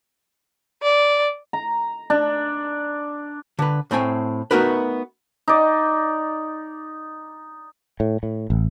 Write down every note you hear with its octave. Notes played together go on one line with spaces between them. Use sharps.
D5
A#5
D4
D3 B4
A2 A3 C4 G5 G#5
A3 B3 D#4 F#4 A#4 B4
D#4 D5
A2
A2
A1